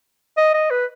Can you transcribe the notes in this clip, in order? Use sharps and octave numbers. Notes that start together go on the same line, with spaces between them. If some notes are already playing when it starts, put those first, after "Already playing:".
D#5
D#5
B4